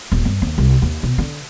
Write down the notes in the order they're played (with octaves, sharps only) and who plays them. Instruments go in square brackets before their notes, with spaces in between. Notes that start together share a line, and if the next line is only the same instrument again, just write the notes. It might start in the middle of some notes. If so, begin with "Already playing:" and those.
[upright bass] D#1
G2
D#2
C2
D#2
B2
D3